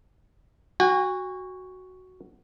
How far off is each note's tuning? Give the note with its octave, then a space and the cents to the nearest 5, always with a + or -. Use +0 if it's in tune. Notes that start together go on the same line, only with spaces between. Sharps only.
F#4 +0 G#5 -40